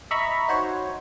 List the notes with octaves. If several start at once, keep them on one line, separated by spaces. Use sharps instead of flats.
D#5 E5 A#5 B5 C#6
D#4 F#4 C5 C#5